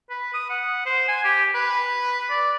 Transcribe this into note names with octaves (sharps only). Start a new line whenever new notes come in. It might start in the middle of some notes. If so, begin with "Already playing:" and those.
B4
D#6
F#5
C5
G#5
G4
B4
D5